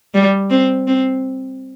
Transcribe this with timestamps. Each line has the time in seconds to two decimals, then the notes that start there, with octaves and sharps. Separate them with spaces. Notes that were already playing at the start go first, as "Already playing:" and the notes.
0.14 G3
0.50 C4
0.87 C4